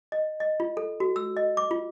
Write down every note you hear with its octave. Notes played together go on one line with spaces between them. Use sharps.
D#5
D#5
F4
A4
F#4
E6
D#5
D6
F4